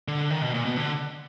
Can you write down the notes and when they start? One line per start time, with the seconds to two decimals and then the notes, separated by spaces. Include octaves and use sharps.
0.08 D3
0.30 D#3
0.42 B2
0.54 A#2
0.65 B2
0.77 D3